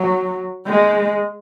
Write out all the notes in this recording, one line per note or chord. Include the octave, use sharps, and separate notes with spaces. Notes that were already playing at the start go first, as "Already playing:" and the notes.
Already playing: F#3
G#3